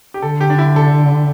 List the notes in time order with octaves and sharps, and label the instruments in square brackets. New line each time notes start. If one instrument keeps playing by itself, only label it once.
[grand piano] G4
[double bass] D3 [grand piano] A4
[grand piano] G4
D4
E4
A4